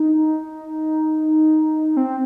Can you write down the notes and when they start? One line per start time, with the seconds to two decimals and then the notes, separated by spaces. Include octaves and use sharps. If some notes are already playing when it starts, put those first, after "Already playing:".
Already playing: D#4
1.97 C4